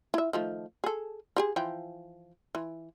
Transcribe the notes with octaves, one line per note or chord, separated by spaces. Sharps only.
E4 E5
D#3 F3 A3
G#4 A4
F3 G4 G#4
E3 F3 G5
E3